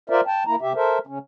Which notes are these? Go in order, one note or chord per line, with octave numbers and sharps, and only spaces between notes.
F4 A#4 C5 D5 E5
G5 A5
A#3 E4 A#5
C3 G4 E5
A4 A#4 C5 E5
C#3 C#4